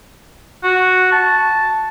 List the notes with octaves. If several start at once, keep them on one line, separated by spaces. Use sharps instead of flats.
F#4
A5